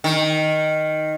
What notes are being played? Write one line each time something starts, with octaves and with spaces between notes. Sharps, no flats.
D#3